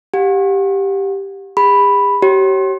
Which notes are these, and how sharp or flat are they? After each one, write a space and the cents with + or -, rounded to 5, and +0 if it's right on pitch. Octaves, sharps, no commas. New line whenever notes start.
G4 +0 F#5 -40
G#4 -45 B5 +0
G4 -35 C#5 -20